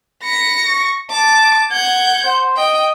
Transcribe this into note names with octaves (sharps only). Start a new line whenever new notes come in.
B5 A#6 C#7
C#6
A5 D6
F#5 G6 G#6
C5
D#5 G5